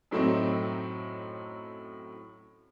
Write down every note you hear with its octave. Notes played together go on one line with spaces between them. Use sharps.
F#2 A2 F#3 A3 C4 D#4